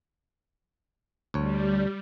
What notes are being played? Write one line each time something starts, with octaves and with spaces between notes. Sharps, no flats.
D2 G3 C#5